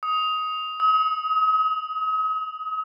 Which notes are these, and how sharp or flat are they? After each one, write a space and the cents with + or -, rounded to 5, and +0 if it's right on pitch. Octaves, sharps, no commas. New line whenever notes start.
D#6 +15
D#6 +40